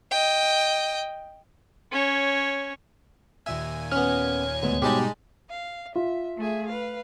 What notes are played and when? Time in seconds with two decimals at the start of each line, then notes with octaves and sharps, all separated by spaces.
0.11 D#5 G5
1.92 C#4 C#5
3.46 D#2 A#2 E5 G#5
3.92 B3 C#4 C#5 F6
4.63 D2 G#2 B3
4.82 G#2 B2 G3 G#3 D#4 G4 A5 B5
5.50 F5
5.96 F4 E5
6.37 A3 G#4 E5
6.67 B4 F5